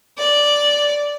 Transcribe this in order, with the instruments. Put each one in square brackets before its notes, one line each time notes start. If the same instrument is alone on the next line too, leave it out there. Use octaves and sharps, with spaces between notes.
[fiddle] D5